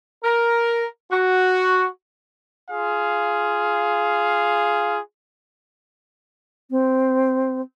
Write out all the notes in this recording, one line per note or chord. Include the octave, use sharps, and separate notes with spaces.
A#4
F#4
F4 G#4 F5
C4